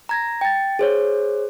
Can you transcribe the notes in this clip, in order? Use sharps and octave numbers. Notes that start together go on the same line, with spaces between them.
A#5 G#6 A#6
G5 A6
G#4 C5 C#5